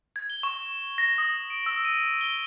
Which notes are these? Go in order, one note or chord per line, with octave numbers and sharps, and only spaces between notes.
G#6
G7
C#6
A#6
D#6
D7
E6
D#7
G7